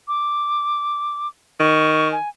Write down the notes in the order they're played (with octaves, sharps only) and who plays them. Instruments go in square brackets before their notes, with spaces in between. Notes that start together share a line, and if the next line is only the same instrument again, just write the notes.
[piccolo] D6
[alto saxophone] D#3 [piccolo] C#6
[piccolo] G#5